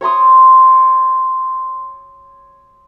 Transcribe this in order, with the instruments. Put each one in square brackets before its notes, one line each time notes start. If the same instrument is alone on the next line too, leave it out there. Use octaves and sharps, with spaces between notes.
[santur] C#5 A#5 C6 D#6